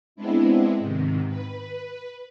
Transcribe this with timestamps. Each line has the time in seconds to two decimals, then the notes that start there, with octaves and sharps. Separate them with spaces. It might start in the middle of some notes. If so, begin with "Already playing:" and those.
0.16 G#3 B3 C4 D4 E4
0.79 G#2 C3 D#3
1.27 B4